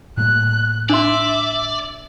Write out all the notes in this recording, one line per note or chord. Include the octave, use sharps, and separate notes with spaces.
A2 G3 A#3 F#6
D4 D5 E5 C6